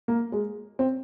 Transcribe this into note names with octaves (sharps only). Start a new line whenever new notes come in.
A#3
G#3
C4